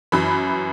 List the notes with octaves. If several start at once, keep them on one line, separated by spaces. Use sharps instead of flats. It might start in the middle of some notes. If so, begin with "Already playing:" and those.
F#2 E3 B5